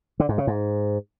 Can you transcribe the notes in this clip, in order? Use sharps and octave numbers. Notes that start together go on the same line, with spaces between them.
D3
G#2
C#3
G#2